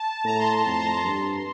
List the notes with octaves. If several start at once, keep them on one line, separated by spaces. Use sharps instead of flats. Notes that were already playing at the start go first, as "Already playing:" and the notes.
Already playing: A5
A2 A#5
C6
A#5
F2 C6
A#5
G2 C6